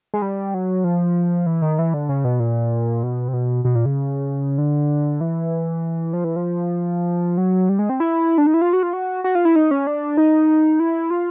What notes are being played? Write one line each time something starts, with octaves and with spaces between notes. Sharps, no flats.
G#3
G3
F#3
F3
E3
D#3
E3
D3
C#3
B2
A#2
B2
C3
B2
B2
A#2
C#3
D3
E3
F3
E3
F3
F#3
G3
G#3
C4
E4
D4
D#4
E4
F4
F#4
F4
F#4
F#4
F4
E4
D#4
C#4
D4
D#4
E4
F4